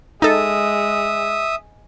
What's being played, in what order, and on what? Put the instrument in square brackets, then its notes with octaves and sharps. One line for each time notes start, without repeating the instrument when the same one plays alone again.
[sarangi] G#3 [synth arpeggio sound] D#4 A4 [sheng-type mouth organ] E5 D#6